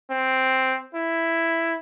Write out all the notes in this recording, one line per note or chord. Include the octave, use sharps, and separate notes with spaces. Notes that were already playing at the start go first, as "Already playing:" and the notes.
C4
E4